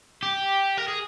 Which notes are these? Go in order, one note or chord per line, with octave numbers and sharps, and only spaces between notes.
G4
A#4
G#4